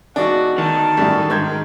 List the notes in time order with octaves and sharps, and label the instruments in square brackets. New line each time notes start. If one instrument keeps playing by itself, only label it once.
[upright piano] E1 D#4 D6 [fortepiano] D4 [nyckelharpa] F#4
[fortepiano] D2 [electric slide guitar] D#3 [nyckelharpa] A5
[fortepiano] F#2 [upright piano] A2 D3 G3
[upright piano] G#2 G6 G#6